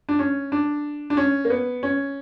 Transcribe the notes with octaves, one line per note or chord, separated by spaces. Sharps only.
D4
C#4
D4
D4
C#4
A#3
B3
C#4